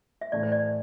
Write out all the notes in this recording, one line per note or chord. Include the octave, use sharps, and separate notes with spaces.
E5
A2 E3 A3 D5
C5
D5